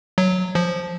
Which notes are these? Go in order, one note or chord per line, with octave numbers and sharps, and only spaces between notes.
F#3
F3